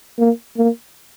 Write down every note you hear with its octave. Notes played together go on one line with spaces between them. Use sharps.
A#3
A#3